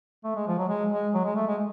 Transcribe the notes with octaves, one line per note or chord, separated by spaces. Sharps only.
A3
G#3
F3
F#3
G#3
G#3
F#3
G#3
A3
G#3